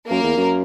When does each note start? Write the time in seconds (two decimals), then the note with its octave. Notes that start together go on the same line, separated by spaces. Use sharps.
0.09 F#2 A#3 A#4
0.23 E2
0.37 F#2